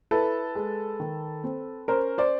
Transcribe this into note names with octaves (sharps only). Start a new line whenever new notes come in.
E4 A4 B4
G#3
D#3
C4
C#4 A#4 C5
C5 D5